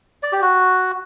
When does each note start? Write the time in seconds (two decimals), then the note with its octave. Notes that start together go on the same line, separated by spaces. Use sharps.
0.23 D5
0.32 G4
0.42 F#4